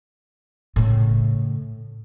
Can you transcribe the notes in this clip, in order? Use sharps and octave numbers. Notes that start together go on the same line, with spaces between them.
A2 C#3